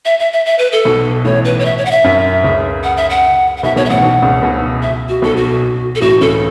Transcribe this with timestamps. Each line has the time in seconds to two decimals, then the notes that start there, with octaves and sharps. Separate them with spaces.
0.05 E5
0.20 E5
0.33 E5
0.46 E5
0.59 B4
0.72 A4
0.85 B1 B2
1.25 A1 A2 C#5
1.45 B4
1.59 C#5
1.65 E5
1.78 C#5
1.85 F#5
1.91 E5
2.04 F#2
2.44 C#2 C#3
2.84 F#5
2.97 E5
3.10 F#5
3.57 F#5
3.63 B1 B2 E5
3.76 B1 B2 C#5
3.85 E5
3.90 A1 A2 F#5
4.03 B1 B2
4.22 C#2 C#3
4.43 B1 B2
4.82 E5
5.09 F#4
5.22 B1 B2 A4
5.36 F#4
5.95 A4
6.01 A1 A2 F#4
6.21 C#2 C#3 A4